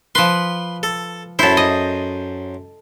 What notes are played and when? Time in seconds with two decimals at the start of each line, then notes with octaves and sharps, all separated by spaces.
0.15 F3 B4 B5 C6
0.83 A4
1.39 F#2 E4 A4 C5
1.57 D#5